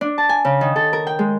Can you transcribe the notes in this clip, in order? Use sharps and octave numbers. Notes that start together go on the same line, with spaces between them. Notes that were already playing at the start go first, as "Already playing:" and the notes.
D4
A5
G#5
C#3
D#3
A4
A#4
G5
G#3